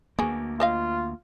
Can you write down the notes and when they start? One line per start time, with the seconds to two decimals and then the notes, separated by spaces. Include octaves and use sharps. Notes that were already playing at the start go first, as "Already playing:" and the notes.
0.19 D2 F#3 A#3 B3 G#4
0.60 F4 C5 D#5 F5